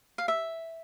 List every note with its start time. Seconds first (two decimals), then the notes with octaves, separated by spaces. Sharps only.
0.18 F5
0.28 E5